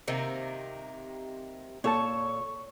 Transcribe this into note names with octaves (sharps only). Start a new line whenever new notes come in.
C3 D#3 A#3
A#2 A4 C#5 A5 C#6